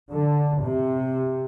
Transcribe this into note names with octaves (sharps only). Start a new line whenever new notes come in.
D3
C3